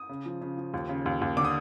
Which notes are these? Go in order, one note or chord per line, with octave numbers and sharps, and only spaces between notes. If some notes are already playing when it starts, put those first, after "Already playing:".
Already playing: D#6
C#3
F3
C#3
F3
D#2
C#3
D#2
D#2
D3 D6
D#6